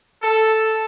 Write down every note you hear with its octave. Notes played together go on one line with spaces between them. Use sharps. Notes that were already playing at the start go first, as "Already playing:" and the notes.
A4